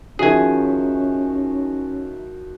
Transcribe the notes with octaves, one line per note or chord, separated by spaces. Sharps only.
D#3 F3 C#4 D#4 F#4 G#4 E5 G#5